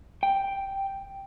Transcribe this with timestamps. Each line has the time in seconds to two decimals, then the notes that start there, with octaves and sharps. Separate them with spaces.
0.23 G5